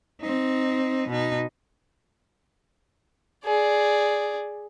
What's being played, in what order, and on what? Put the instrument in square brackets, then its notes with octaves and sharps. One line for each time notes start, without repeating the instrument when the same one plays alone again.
[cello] C4 D#4
B2 D#4
[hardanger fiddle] G#4 D5